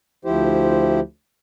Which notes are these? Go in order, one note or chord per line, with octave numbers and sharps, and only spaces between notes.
D2 F3 E4 G4 C5